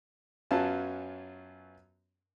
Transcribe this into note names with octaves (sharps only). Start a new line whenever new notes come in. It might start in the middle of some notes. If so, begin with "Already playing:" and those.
F#2 F#3 B3 C#4 F4 A5